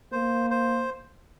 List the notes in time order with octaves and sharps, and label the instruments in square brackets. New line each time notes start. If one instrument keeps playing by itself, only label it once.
[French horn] A#3 [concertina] C5
[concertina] C5